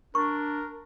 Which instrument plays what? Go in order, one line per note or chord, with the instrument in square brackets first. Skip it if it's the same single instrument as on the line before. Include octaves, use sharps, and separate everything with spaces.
[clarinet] D4 [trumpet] A#4 [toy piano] C#6